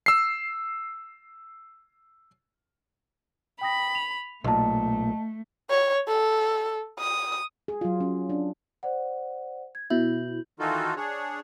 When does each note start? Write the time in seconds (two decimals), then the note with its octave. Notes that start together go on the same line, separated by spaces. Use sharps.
0.06 E6 C7
3.61 G5 B5 D#6 A#6
3.95 F7
4.44 B1 A#2 A3 D#5 A5
5.70 C#5
6.08 A4
7.00 D#6
7.68 G#4
7.81 F#3 F4
8.00 C#4
8.30 D4
8.83 C5 D5 F#5
9.75 G#6
9.90 B2 E4 G6 F#7
10.60 D#3 E3 D#4 F4 F#4 A4
10.96 D4 G#4 C#5